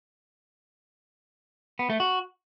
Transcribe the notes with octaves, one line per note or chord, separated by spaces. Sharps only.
B3
A3
F#4